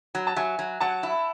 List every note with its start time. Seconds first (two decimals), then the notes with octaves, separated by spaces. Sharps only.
0.15 F#3
0.27 A5
0.36 F#3 E5 G#5
0.59 F#3
0.80 F#3 F#5 A5
1.03 E4